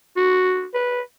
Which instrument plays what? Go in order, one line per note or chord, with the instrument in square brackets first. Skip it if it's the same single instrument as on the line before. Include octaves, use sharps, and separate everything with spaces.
[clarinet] F#4
B4